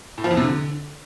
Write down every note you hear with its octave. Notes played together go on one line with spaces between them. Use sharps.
A2
F3
E2
C3
D3